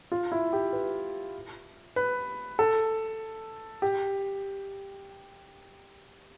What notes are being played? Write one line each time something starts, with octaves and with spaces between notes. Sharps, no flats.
F4
E4
G4
B4
B4
A4
G4